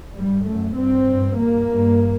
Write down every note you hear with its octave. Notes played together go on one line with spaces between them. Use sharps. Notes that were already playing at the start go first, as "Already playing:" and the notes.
G2 G3
F#2 A3
G2 C4
G2
G2 A#3
G2